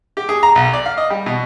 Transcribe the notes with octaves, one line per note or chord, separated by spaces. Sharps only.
G4
G#4
A#5
B1
D5
F5
D#5
G3
B2